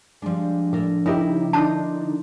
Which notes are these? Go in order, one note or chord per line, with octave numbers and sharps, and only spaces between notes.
F3 G3 G#3 D4
A2 D4 A4 A#4
C#3 D#4 E4 G4 A#4
D3 D4 D#4 A5 A#5 C6 G6